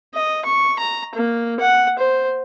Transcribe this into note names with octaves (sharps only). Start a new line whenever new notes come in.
D#5
C#6
A#5
A#3
F#5
C5